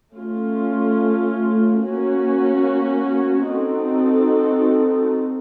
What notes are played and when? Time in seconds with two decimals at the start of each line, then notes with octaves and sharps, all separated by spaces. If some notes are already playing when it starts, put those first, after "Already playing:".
0.15 A3 C#4 F4
1.82 A#3 C#4 F#4
3.50 C4 D#4 F#4 A4